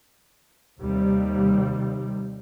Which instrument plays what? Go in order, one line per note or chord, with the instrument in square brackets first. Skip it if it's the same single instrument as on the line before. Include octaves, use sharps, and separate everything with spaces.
[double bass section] D#2 C3 G3